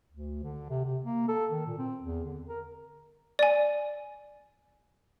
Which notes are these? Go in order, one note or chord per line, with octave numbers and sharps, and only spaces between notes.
D2
D3
C3
C3
A#3
A4
D#3
A#2
C4
E2
D3
A#4
D5 G#5